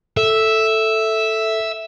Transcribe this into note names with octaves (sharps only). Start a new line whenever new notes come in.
A4 E5